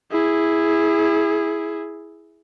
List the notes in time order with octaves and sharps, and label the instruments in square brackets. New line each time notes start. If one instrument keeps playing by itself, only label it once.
[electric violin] E4 G#4